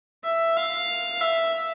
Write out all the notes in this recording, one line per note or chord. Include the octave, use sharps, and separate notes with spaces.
E5
F5
E5